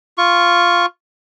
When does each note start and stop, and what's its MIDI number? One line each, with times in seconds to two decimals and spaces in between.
0.18 0.86 65
0.18 0.86 85